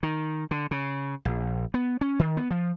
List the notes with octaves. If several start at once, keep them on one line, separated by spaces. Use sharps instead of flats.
D#3
D3
C#3
A#1
B3
C#4
D#3
B3
F3